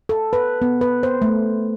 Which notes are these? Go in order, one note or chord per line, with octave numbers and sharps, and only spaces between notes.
A4
B4
B3
B4
C5
A3